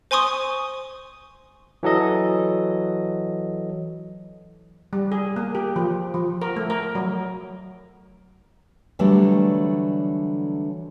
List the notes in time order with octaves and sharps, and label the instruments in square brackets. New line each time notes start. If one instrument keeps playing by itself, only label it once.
[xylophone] C5 G#5 C6 C#6 D#6
[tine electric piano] E3 F#3 A4 D#5
[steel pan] G3
G#4
A#3
G4
F3
F3
A#4
A3
A#4
F#3
[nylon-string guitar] D3 E3 F#3 G3 A3